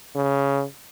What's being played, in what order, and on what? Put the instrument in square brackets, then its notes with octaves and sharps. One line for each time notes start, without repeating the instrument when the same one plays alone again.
[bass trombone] C#3